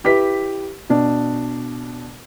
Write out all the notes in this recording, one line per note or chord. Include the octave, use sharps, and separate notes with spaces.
E4 G4 B4 B6
B2 D4